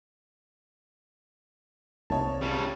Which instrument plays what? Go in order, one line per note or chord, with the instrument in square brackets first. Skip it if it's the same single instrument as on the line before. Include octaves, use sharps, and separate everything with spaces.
[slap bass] C2 [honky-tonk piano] A#3 D#4 C#5 [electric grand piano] A5
[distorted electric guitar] C#3 G3 [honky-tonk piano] F4 C#5